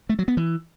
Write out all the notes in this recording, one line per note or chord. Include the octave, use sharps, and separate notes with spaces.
A3
F#3
B3
E3